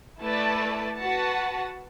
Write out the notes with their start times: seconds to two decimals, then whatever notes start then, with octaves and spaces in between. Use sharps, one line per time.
0.21 A3 E4 B4 D5 A5
0.97 F#4 B4 F#5 A5